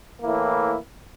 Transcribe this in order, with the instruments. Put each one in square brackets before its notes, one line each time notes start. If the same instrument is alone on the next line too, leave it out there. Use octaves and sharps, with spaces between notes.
[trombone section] A2 E3 A#3 E4